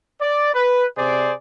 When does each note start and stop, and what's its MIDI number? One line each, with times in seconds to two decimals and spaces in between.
0.21 0.54 74
0.54 0.85 71
0.97 1.33 48
0.97 1.33 68
0.97 1.33 72
0.97 1.33 74